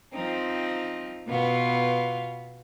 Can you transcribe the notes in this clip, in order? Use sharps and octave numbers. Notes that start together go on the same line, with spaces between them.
F3 C4 D#4
B2 B3 F4